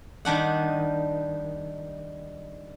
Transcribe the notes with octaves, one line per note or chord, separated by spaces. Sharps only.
D#3 G3 D4 F#5